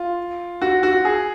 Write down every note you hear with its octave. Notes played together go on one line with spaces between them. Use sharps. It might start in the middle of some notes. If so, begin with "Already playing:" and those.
Already playing: F4
F#4
F#4
G#4